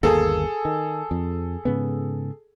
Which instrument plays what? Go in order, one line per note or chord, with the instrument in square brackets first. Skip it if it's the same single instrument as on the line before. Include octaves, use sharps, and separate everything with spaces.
[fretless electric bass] G1 D#2 A#3 [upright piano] G#4 A4
[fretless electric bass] D#3
F2
G#2 C#3 B3